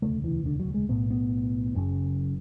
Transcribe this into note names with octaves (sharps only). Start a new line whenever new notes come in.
E1 D2 C#3 A3
E3
D3
F#3
G#3
B1 A2 B3
B3
F#1 F#2 C#3